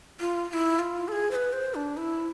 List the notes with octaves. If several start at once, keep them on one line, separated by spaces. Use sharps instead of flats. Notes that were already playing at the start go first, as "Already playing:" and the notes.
F4
F4
E4
F4
A4
G#4
C5
B4
C5
D4
E4